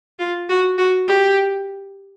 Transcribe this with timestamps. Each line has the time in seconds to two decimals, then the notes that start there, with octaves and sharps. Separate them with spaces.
0.19 F4
0.49 F#4
0.78 F#4
1.07 G4